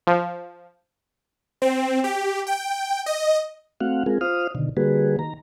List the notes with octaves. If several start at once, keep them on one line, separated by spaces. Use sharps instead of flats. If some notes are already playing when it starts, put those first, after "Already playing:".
F3
C4
G4
G5
D#5
A3 C4 F#4 F5 F#5
G#3 C4 F4 G#4 A#4
F4 C5 F5 D#6 F6
B2 D3 D#3
D3 G3 A#3 F#4 G#4 B4
D#3 A#5